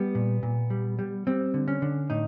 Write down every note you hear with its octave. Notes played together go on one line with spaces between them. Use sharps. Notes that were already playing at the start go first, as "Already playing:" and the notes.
Already playing: G3 B3
A#2
A#2
G3
G3
G3 C4
D3
C#4
D3
A2 D#4